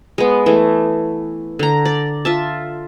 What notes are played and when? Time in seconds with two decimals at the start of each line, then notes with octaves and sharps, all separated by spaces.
0.18 G#3 B3
0.46 E3 A3
1.59 D3 A#5
1.85 D5
2.25 F4 E5 A5